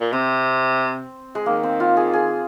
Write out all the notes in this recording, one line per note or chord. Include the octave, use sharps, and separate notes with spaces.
A#2
C3 C4
G#3
D#3 A#3
C4
F4
G#4
G#4